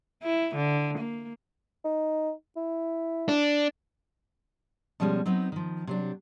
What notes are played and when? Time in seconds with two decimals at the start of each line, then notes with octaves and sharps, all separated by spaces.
0.23 E4
0.55 D3
0.98 A#3
1.84 D#4
2.56 E4
3.29 D4
5.00 B2 F3 G3 G#3 C#4
5.26 F#3 B3 C4 D#4
5.52 D#3 F3
5.87 C3 F#3 D4